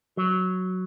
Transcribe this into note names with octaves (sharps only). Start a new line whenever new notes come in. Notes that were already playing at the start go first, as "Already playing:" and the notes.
F#3